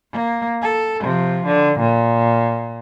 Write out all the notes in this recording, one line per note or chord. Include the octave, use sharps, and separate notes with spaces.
A#3
A4
C3 F3
D3
A#2